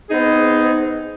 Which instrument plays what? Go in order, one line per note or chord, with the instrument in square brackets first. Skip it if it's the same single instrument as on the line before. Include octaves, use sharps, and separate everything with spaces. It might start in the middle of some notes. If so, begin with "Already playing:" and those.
[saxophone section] B3 C4 D#4 G#4